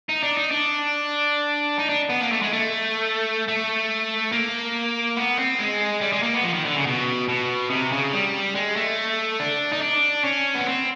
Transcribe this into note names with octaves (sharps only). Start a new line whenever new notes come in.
D#4
D4
D#4
D4
D#4
D4
B3
A#3
A3
G#3
A3
A3
A#3
B3
C4
G#3
G3
G#3
A#3
B3
F3
D#3
D3
C#3
B2
B2
C3
C#3
G3
G#3
A3
D4
D#4
D4
C#4
B3
C4